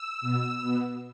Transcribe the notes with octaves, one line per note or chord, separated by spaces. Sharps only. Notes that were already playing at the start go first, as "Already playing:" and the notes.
Already playing: E6
B2 B3
B2 B3